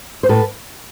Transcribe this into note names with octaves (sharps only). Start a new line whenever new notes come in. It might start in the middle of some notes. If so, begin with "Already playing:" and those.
C5
A2 A4 B4